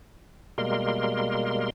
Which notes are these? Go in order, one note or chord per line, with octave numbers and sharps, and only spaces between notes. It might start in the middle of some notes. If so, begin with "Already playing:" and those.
B2 G3 G#3 A#3 A#4 C6